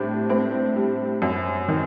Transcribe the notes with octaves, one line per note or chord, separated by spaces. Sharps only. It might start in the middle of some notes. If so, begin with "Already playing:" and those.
Already playing: A2 G3 C4 D4
A2 C4
G3
F#2
D#3